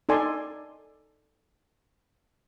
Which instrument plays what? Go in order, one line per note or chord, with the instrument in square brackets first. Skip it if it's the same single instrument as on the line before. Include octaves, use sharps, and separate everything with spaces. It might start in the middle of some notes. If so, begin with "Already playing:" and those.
[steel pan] D#4 A4 D5 G#5 C6